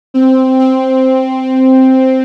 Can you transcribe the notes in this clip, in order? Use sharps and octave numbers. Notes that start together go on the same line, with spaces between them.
C4
C4